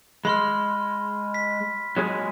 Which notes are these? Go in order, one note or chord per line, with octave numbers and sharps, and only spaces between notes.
G#3 B5 C6 F6
B6
F#3 G#3 G#4